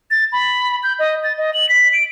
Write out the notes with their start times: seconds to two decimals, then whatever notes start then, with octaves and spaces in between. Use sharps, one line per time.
0.11 A6
0.33 B5
0.83 G6
0.99 D#5
1.24 A6
1.38 D#5
1.54 F#7
1.69 B6
1.93 D7